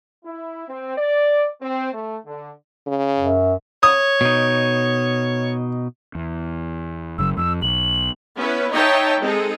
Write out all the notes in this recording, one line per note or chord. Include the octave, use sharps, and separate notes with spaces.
E4
C4
D5
C4
A3
D3
C#3
F#2
C#5 D#6
B2 D#4
E2
F#1 C#3 F#3 E6
F2 E6
B1 F#7
B3 C#4 E4 B4
D#4 C#5 D#5 E5 G5 A5
G#3 C4 D#4 G#4 A4